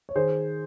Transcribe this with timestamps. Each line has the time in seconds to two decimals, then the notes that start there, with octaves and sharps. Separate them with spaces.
0.09 C#5
0.15 D#3 G#4 C5